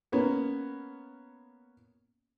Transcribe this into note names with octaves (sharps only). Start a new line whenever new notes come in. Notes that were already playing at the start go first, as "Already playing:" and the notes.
A#3 B3 C#4